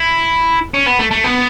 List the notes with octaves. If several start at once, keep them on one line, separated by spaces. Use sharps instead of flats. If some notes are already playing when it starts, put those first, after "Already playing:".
Already playing: E4
C#4
B3
A3
A3
B3